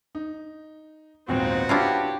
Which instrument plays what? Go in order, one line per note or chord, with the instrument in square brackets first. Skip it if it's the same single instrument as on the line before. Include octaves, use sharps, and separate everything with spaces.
[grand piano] D#4
[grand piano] A#1 D#2 G#2 [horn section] B3 F#4 [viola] C4
[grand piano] C#4 [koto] D4 E4 F4 [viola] G4